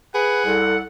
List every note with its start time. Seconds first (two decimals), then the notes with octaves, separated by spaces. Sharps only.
0.15 G#4 B4 F#5
0.45 C2 A4